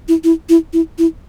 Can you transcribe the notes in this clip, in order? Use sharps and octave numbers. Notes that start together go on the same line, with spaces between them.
E4
E4
E4
E4
E4